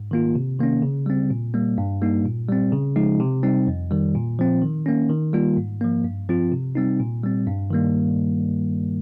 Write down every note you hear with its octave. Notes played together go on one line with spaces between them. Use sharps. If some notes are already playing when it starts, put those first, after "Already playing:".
Already playing: G#2
D#3 A#3 F4
C3
D#3 A#3 C#4
C#3
G3 C4
A#2
G3 A#3
G2
G3 A#3 D#4
A#2
G3 C4
C#3
F3 G#3 D#4
C3
G3 C4 D#4
F2
D#3 G3
A#2
F3 C4
D#3
A#3 C#4
D#3
G3 A#3 F4
G#2
F3 A#3
G2
F3 C4 F4
C3
G3 C4 D#4
A#2
G3 C4
G2
D#3 G3 A#3